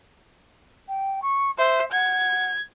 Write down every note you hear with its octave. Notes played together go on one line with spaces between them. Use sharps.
G5
C#6
C5 E5
F#5 G#6